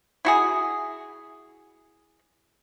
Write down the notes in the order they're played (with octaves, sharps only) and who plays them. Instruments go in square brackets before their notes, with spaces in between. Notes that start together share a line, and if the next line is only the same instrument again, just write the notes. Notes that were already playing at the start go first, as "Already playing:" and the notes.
[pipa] E4 F#4 G#4